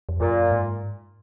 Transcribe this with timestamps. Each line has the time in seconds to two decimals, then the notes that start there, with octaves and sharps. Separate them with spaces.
0.09 F2
0.20 F#2 A#2
0.51 G#2